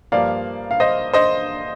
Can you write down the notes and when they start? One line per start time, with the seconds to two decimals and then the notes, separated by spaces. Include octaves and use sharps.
0.12 G2 F3 A#3 D5 F5
0.71 F5
0.80 C5 D#5
1.13 C5 D#5